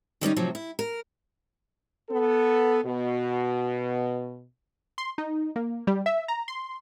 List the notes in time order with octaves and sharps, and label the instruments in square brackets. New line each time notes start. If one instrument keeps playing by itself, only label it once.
[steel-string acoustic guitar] D#3 G3 C#4 D#4
A2 C3 F3 F#3
E4
A#4
[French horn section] B3 A4
B2
[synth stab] C6
D#4
A#3
G3
E5
A#5
C6